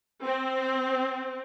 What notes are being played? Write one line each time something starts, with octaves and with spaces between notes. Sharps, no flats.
C4